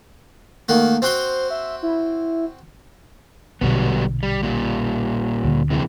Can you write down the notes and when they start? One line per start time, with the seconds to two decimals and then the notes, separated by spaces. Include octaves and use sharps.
0.69 D#3 A3 A#3 F#4
1.02 C4 F#4 C5 C6
1.50 E5
1.83 E4
3.61 A#1 B2 D3 F#3 G3 B3
4.23 G3
4.43 A#2 G3
5.44 D2 D3
5.70 C3 E3 G#3